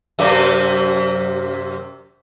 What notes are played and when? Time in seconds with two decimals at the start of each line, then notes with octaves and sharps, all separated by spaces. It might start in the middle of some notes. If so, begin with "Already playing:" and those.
0.19 F#2 C3 A#3